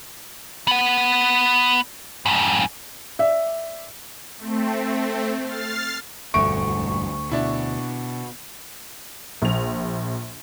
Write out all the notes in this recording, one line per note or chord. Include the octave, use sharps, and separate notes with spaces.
B3 F#5
F2 G#2
D5 E5
A3 C4
F6 A6 C7
E1 D2 G2 A3 C#6 D7
B2 D4 E4
A#1 F7